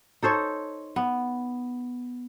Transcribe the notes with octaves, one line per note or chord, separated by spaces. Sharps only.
D#4 A4 C5 C#5
B3